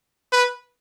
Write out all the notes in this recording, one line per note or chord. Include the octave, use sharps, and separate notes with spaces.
B4